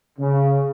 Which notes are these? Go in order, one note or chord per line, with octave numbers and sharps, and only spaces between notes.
C#3